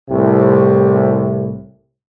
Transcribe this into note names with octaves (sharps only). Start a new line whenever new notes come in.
C2 A2 C3